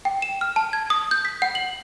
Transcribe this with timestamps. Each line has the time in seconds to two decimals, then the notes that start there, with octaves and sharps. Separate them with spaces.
0.05 G5
0.22 E7
0.41 F6
0.56 A5
0.73 G#6
0.90 D#6
1.11 G6
1.25 B6
1.42 F#5
1.55 F#7